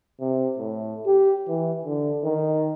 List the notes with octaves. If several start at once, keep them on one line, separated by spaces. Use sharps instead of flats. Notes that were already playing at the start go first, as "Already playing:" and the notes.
C3
A2
G4
E3
D3
D#3